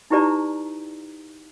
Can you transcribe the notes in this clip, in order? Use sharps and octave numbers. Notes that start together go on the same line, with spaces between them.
D#4 E4 G4 B4 D5 A#5